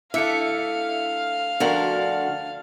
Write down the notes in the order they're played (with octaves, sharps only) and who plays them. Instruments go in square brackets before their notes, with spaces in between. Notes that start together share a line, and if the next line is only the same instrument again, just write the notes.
[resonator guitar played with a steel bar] D3 A3 [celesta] E4 C#7 [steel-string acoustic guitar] E5 [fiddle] F5
[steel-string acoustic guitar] D2 D3 [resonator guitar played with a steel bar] F3 F#4 A#4 [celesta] D4 D5 F#7